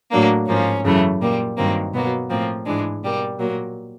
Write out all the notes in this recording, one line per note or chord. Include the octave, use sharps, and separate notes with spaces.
A2 F#3 A#3 D4
G#2 F3 A#3 C#4
F#2 C#3 E3 A3
A#2 G3 A#3
G2 D#3 F#3 A#3 C4
B2 F#3 A#3 B3
A2 F3 A#3 C4
G#2 E3 G#3 D4
B2 G3 A#3
A#2 F#3 A#3